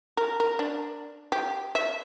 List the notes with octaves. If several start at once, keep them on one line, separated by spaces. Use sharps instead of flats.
A#4
A#4
D4
G4
E5